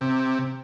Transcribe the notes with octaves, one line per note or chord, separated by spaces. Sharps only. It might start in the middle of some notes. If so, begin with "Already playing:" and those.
C3